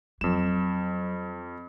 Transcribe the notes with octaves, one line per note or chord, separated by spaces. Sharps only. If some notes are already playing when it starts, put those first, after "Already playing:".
F2 F#3 E7